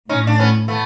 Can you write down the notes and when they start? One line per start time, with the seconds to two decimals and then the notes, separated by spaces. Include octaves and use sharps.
0.09 A2 C#4 D#4
0.27 D4
0.39 B3 C#4
0.68 A3 B3